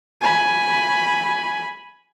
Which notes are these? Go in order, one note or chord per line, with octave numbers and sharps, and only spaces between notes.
G#5 B5